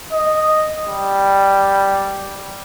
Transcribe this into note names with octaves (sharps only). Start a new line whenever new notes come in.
D#5
G3